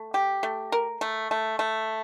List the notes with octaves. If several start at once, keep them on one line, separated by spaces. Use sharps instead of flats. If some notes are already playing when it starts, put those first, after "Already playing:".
Already playing: A3
G4
A3
A#4
A3
A3
A3